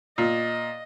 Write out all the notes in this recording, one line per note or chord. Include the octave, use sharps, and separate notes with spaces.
A#2 D#5